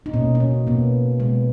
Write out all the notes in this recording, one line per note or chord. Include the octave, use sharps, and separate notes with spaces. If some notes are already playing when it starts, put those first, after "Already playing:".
D#4
B2 A#3 C#4
C#4
D#4
B2 A#3 B3
B2 G#3 B3